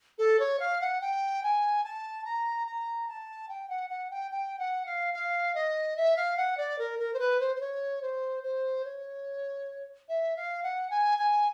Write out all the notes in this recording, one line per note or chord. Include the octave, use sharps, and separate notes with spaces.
A4
C#5
F5
F#5
G5
G#5
A5
A#5
A#5
A5
G5
F#5
F#5
G5
G5
F#5
F5
F5
D#5
E5
F5
F#5
D5
A#4
A#4
C5
B4
C5
C5
C#5
C5
C5
C#5
E5
F5
F#5
G#5
G#5